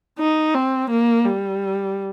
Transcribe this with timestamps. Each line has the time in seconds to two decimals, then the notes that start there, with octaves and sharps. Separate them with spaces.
0.18 D#4
0.54 C4
0.90 A#3
1.25 G3